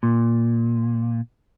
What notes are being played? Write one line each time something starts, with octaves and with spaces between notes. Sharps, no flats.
A#2